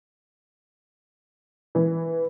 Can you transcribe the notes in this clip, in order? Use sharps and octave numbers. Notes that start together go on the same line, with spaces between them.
E3